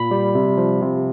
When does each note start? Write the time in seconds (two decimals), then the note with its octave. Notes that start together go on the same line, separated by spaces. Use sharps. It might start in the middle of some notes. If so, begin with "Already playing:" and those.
Already playing: A#2 B5
0.11 G3
0.35 C3
0.57 F3
0.82 C3